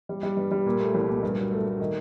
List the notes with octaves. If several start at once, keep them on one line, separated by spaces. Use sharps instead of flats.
G3
G3
G2
G3
A#2
A3
C2
A#2
G2
F#3
A3
A3
D#3